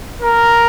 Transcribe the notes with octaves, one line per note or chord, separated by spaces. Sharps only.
A#4